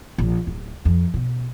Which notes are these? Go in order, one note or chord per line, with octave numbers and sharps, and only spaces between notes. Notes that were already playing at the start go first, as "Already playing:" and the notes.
A#1
D1
F2
B2